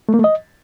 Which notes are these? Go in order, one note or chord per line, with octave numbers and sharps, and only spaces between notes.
A3
A#3
A3
D#5